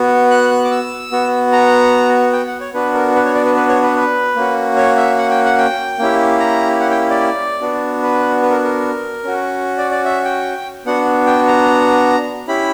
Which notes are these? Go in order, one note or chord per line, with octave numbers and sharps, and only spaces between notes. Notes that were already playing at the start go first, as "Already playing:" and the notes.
Already playing: B3 F#4
F#6
F#6
D6
E6
B3 F#4
A#5
G5
F#5
C#5
B3 D4 F#4 B4
A#4
B4
C#5
D5
B4
B4
C#5
B4
B4
A#3 C#4 F#4
C#5
E5
F#5
G5
F#5
G5
A#3 C#4 E4 G4
A#5
F#5
G5
D5
B3 D4 F#4
B4
B4
A#4
A#4
C#4 F#4
D5
D5
E5
G5
B3 D4 F#4 F#5
G5
A#5
C#4 E4 G4 B5